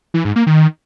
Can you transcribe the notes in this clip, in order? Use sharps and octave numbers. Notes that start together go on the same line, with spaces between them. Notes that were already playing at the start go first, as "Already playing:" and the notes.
E3
G#2
A#3
D#3